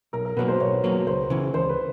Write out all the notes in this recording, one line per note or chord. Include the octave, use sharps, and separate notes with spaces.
B1 A#4
A#4
B2 F#3 A#3 B4
C5
B1 C#5
B2 F#3 A#3
C#2 C5
C#3 E3
C#2 C5
B4